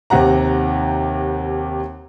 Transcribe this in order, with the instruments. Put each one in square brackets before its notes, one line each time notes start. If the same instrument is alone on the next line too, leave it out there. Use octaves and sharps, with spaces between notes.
[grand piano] D#2 C3 F#5 A#5